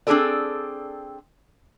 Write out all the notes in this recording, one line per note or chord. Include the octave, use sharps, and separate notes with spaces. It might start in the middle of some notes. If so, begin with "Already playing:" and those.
C4 D4 E4 G#4 A4 D5